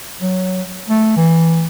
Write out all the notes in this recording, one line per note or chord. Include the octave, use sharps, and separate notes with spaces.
F#3
A3
E3